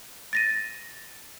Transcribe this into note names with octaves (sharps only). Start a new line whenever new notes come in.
A6 A#6 D#7